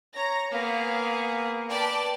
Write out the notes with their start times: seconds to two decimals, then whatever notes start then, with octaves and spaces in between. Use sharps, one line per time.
0.16 C#5 A#5 A#6
0.52 A#3 B3 G#4 F5
1.69 B4 D5 G5 A5